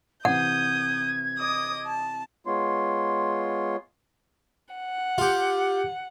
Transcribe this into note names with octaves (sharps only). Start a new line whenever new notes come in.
C3 E3 F#5 D#6 G6 G#6
D#5 D6 D#6
A5
G#3 B3 F4 C#5 C6
F#5
F4 G4